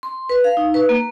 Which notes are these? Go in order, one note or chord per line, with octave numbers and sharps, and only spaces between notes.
C6
B4
F5
D#4
B4
A#3